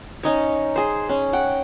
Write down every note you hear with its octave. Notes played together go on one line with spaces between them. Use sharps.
C#4 D#4 C#5
G#4 C5
C#4
F#5 G5